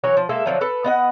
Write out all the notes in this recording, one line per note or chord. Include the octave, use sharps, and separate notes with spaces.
E3 F#3 A#4 C#5
F3
G#3 A#3 A4 E5
D3 F3 F#3
A4 B4
B3 D#5 F#5